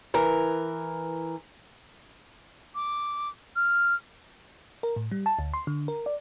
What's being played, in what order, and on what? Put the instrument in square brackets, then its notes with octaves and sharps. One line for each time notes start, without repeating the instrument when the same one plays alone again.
[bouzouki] E3 A#4
[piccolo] D6
F6
[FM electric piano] A#4
A2
G3
A5
D2
C6
D3
A#4
D5